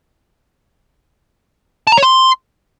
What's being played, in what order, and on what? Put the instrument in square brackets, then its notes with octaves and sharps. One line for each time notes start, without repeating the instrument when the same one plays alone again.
[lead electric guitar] A5
A#5
C#5
C6